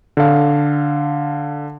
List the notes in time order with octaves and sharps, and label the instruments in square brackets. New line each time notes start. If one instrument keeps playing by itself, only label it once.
[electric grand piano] D3 A4 F5